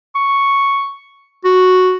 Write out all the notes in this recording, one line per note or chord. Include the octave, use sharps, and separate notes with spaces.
C#6
F#4